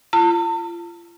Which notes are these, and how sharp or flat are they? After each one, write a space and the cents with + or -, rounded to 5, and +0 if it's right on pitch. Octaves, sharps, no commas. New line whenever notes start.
F4 -35 A5 +45